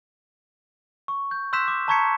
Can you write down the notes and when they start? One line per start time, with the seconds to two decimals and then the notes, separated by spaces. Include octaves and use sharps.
1.08 C#6
1.31 G6
1.53 C6 E6 F#6 G6 B6 E7
1.68 D6
1.88 A5 A#5 C#6 G#6 B6 C#7